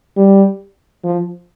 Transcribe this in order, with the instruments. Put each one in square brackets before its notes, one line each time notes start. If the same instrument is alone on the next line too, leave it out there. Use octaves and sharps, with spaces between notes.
[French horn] G3
F3